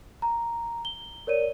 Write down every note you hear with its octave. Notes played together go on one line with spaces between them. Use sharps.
A#5
G7
A#4 C#5 D5 D#7